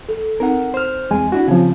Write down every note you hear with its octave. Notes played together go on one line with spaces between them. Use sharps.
A4
C4 D#4 A#4 F#5
C5 F6
E2 G#3 C4 G#5
D4 E4 F#4
C#3 F3 C4 G4